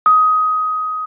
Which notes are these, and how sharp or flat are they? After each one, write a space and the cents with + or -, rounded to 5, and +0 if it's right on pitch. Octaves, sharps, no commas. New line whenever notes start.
D#6 +15